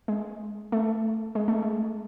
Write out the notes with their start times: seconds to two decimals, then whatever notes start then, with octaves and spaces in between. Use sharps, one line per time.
0.08 G#3
0.72 A3
1.35 G#3
1.48 A3
1.62 G#3